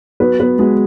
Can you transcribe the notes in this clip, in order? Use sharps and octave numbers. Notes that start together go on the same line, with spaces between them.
F#3 B3 B4
B3 B4
F#3 G#3 G#4